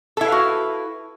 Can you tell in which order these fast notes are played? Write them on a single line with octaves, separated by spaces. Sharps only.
A4 E4 B4 F5 F#4